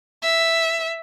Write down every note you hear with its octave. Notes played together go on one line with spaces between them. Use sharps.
E5